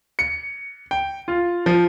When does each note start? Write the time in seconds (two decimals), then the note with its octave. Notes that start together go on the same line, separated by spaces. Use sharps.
0.19 C#7
0.91 G5
1.28 F4
1.66 F3